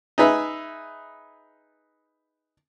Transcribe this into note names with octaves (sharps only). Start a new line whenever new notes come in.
D#4 G#4 B4 E5